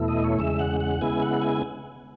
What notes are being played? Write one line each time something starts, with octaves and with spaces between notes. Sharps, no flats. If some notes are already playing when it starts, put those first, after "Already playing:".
Already playing: E2 B2 A3 E4
D#5
C#5
E2 C#3 G#3 E5
F#5
F#5
C#3 G#3 B3 E4 G#5
F#5
G#5